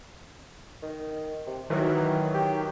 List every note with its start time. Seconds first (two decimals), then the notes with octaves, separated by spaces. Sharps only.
0.82 D#3
1.47 C3
1.70 D#3 E3 F#3
2.34 G4